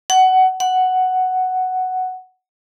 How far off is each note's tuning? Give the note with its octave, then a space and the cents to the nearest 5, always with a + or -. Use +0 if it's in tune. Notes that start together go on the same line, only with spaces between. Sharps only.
F#5 +20
F#5 +5